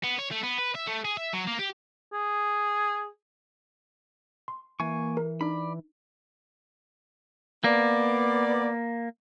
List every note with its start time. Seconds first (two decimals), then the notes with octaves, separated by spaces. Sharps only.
0.03 B3
0.19 C#5
0.31 A3
0.43 B3
0.58 B4
0.75 E5
0.87 A3
1.05 G#4
1.17 E5
1.33 F#3
1.47 A#3
1.59 G4
2.13 G#4
4.48 C6
4.80 E3 A#3 G#5 C#6
5.17 A#4
5.41 D4 D#4 D5 B5
7.64 A#3 B3 D5